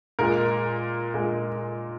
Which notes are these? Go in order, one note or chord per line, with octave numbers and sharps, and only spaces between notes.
A#2 G#3 A#4
A#2 G#3